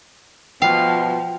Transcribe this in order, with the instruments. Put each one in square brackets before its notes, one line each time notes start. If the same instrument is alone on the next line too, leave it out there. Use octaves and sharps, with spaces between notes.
[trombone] B2 [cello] F3 [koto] F5 [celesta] G5